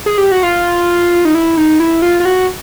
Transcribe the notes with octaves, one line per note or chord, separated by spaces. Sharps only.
G#4
G4
F#4
F4
D#4
E4
D#4
E4
F4
F4
F#4